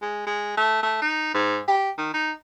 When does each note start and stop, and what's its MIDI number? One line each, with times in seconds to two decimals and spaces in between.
0.02 0.24 56
0.27 0.57 56
0.57 0.81 57
0.83 0.98 57
1.02 1.32 63
1.34 1.59 44
1.68 1.90 67
1.98 2.10 51
2.14 2.32 63